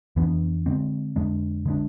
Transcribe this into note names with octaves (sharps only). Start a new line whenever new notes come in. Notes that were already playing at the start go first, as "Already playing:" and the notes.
F2 E3 B3 D4
D3 G#3 C4
F2 D3 G#3 D4
D3 G#3 D4